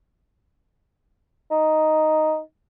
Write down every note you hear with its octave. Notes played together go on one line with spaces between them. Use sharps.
D#4